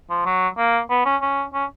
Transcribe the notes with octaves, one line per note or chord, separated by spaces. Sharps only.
F3
F#3
A#3
B3
C#4
C#4
C#4